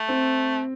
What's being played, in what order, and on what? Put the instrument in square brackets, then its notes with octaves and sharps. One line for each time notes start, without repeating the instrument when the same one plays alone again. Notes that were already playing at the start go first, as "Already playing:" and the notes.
Already playing: [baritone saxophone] A3
[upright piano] C4